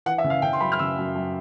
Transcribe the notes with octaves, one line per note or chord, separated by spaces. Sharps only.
E3 F#5
E5
C#3
F5
C#3 G5
C6
F#2 B5
F6
C#3 E6
F#2
F#2